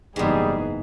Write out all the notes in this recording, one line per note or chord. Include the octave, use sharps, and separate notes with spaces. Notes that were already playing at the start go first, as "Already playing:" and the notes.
F#1 E2 G#2 G3 B3 D#4 G#4